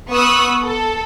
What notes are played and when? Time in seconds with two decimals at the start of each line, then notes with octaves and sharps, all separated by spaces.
0.11 B3 C#6 D#6 E6 F#6
0.63 A4